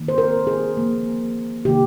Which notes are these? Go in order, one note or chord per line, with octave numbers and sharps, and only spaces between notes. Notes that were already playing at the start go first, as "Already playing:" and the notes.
Already playing: D#3 A#3
C5
A#4
G#4
D3 F3 A#3
C3 D#3 A#3 G4